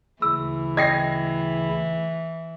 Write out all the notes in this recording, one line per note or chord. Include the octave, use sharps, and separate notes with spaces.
D2 C#3 E3 E4 E6
D#5 G5 D#6 G#6 A#6 C7